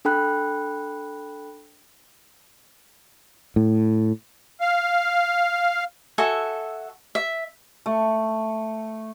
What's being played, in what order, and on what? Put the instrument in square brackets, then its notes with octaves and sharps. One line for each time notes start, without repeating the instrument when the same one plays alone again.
[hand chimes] D4 A4 G5 B5 F#6
[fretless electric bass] A2
[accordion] F5
[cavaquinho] F#4 A4 E5 G#5
E5
[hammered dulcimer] A3